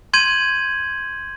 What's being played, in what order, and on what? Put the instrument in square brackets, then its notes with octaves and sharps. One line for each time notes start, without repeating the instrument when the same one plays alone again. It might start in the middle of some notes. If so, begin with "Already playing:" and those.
[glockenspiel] C6 G6 G#6 D#7 F#7